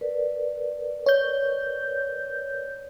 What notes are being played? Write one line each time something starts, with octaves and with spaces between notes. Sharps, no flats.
A#4 B4 D5
C#5 G6